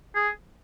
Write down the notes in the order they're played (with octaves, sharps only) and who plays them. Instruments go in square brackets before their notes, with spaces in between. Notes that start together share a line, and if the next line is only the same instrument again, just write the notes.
[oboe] G#4